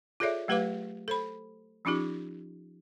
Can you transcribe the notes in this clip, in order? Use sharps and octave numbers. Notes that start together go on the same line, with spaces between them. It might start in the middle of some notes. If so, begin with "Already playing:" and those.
F4 G#4 A4 C#5 D5 E5
F#3 A3 G4 B4 F5 D6
A4 C5 B5
F3 C#4 D#4 F4 G4